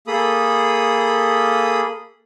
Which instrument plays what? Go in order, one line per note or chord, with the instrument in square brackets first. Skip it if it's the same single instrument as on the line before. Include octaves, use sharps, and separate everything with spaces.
[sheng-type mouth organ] A#3 G#4 A4 B5 D#6